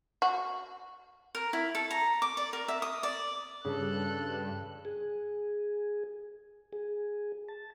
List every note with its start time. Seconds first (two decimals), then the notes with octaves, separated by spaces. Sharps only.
0.22 F#4
1.35 A#4
1.53 E4
1.75 A4
1.90 A#5
2.22 D6
2.37 D5
2.53 A#4
2.68 E5
2.82 D#6
3.03 D5
3.65 G2 C#3 A4 F#6
4.85 G#4
6.73 G#4
7.49 A5